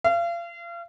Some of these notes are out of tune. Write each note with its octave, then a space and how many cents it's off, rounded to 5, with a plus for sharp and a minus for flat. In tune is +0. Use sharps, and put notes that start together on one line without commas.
F5 -35